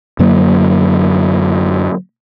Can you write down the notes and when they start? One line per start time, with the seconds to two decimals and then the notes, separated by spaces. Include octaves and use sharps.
0.19 F#2 D3 F#3 A#3